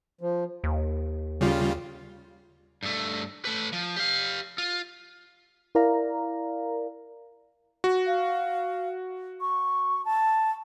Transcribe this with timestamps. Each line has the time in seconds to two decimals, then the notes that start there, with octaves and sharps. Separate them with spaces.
0.21 F3
0.64 D#2
1.41 C#3 G3 F4
2.83 G2 A3
3.45 A3 B4
3.73 F3
3.96 G4 F5
4.58 F4
5.75 E4 A#4 D5 F5 A#5
7.84 F#4
8.07 F5
9.41 C#6
10.05 A5